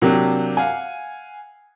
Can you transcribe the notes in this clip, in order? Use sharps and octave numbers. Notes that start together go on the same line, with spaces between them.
C3 F#3 A#3 D4 G4
F5 F#5 G#5